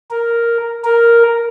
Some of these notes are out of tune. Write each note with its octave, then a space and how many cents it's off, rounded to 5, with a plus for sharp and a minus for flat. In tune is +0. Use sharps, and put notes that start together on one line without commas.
A#4 +0
A#4 +0